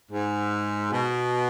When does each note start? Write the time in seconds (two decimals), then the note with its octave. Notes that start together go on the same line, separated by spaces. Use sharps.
0.10 G#2
0.91 B2